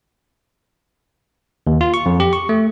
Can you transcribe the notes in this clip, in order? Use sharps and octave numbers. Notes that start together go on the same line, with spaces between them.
D#2
F4
C#6
F2
G4
C#6
A3